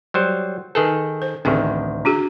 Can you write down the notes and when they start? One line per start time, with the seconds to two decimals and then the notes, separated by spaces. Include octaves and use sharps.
0.14 F#3 G3 C5
0.75 D#3 G#4 A4 B4
1.22 C5
1.45 A1 D2 D#3 C4 G#4
2.05 D4 F#4 G#4